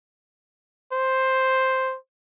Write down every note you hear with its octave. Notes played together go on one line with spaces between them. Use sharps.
C5